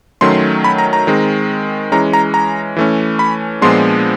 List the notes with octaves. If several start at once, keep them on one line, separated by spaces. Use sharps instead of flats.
D#3 F#3 A3 C#4 C6
B5
A#5
A#5
D#3 G#3 C4
E3 G#3 C#4 A#5
A#5
A#5
E3 A3 C#4
B5
A#2 F3 G#3 B3 D4 C6